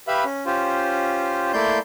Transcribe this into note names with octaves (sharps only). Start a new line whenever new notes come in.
G4 B4 E5 F5 B5
C#4
C#4 F4 G4 C5
A3 A#3 E4 D5 C6 G6